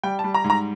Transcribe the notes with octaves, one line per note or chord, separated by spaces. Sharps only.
G3 G5
A5
G3
A#5
G#2
A#5